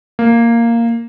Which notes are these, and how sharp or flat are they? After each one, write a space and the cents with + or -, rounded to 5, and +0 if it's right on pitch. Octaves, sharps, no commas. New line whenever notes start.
A#3 -5